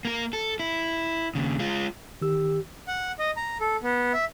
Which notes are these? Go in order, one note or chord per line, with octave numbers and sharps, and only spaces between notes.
A#3 A#4
A4
E4
D#2 C#3
G#3 F4
D#3 G4 E6
F#5
D#5
A#5
A4
B3
E5